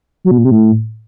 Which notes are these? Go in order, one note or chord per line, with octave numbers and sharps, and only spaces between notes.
F#3
B2
A#2
C3
A2